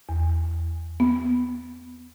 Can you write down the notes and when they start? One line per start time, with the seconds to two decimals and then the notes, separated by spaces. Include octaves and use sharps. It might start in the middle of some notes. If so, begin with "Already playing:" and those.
0.09 E2
1.00 B3